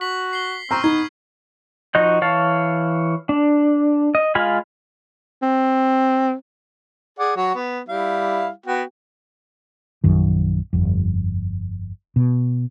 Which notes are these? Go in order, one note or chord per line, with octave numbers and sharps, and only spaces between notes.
F#4 B6 F#7
C7 G7
C4 A#5 C#6 F6 C7
B3 D#4 G#6
F3 D#4 F#4 D#5 G6
E3 C#5 F5 A5
D4
D#5
G#3 F4 F5 G#5 B5
C4
G#4 D5 F#5
F#3 F#4
B3
G3 E4 F5
B3 F#4 G5
A#1 F#2 D#3
G1 F2
B2